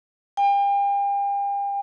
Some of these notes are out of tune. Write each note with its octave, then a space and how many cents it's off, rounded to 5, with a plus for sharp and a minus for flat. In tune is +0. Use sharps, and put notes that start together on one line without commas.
G5 +40